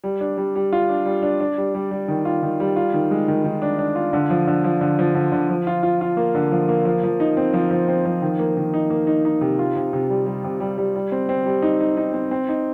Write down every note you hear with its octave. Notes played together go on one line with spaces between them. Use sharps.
G3
D4
G3
G3
F4
D4
G3
D4
D4
G3
G3
G3
D#3
F4
D#3
G3
F4
D#3
G#3
D#3
D#3
D4
D4
F4
D3
F3
D3
F3
D3
F3
D3
D3
F3
F4
F4
F4
A#3
D3
F3
A#3
F3
F3
D#4
C4
F3
F3
C4
F3
D#3
A#3
D#3
D#4
A#3
D#4
D#4
C3
F4
C3
C3
G3
G3
C3
G3
G3
G3
C4
C4
G3
D#4
D#4
D#4
C4
C4
D#4